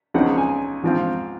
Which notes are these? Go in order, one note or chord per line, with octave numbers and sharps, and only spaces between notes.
C#2 C#3 F3 C4 D#4 F#5
G#5
G#2 F3 C4 F4